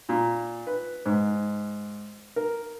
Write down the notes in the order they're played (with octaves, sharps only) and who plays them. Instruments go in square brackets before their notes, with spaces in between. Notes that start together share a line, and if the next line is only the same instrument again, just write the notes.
[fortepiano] A#2
B4
G#2
A#4